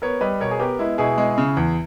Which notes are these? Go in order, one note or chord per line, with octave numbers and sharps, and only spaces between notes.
B3 A#4 C#5
G3 B4 D#5
B2 A#4 C#5
G#4
B3 G4 A#4
G#3 E4
B2 E4 G#4
G#3
C#3
E2